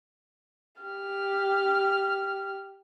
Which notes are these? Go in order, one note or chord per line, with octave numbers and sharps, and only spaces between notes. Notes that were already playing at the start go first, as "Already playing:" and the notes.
G4 F6